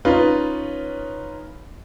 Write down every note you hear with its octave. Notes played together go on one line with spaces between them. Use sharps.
C#4 D#4 F4 B4